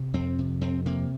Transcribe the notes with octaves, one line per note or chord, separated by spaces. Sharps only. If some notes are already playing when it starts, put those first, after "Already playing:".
Already playing: C3
F2 C4
C3
F2 C4
C3 A#3